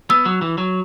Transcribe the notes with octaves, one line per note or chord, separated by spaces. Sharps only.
B3 E6
F#3
E3
F#3